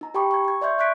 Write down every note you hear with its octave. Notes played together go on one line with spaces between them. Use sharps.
D#4 A#5
G4 G5 A5 B5 C#6 D6
C#6 G#6
C#6 G#6
D5 E5 C6 C#6 G6 G#6
E5 C#6 F#6 G#6 B6 D7